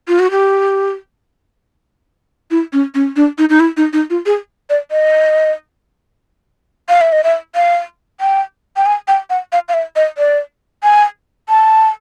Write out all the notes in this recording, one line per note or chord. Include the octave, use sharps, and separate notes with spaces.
F4
F#4
G4
E4
C#4
C#4
D4
D#4
D#4
E4
D#4
D#4
F4
G#4
D5
D#5
F5
E5
D#5
E5
F5
G5
G5
G#5
G5
F#5
F5
F5
E5
D#5
D5
G#5
A5